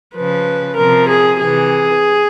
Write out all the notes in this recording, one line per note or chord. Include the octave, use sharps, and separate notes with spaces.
C#3 F3 B4
C3 F3 A#4
G#4
C3 E3 G#4